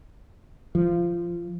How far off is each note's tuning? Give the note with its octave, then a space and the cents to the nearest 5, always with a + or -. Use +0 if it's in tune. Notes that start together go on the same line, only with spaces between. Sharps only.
F3 -20